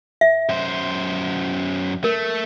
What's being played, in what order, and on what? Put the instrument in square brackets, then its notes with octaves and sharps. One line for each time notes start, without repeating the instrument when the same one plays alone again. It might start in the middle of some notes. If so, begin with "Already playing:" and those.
[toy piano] E5
[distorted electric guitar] F#2 C5
[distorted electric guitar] A3 [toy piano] A#4